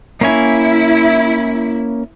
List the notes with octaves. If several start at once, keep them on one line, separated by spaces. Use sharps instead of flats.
A#3 C#4 E4 G#5